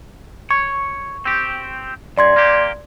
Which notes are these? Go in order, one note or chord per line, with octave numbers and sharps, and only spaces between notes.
C#5 C#6
C4 G4
F#2 D5 C6 G#6
A#3 G4